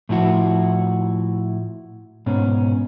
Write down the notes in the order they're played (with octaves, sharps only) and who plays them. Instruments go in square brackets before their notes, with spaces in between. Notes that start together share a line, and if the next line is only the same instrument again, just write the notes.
[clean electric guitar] A2 F3 E4 F#4
G#2 B2 C#4